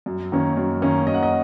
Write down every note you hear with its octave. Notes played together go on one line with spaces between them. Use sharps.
F#2
D#3 A#3 C#4
F#2
D#3 A#3 C#4
F#2 D#5
F#5
D#5